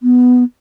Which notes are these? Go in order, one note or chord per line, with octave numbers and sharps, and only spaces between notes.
B3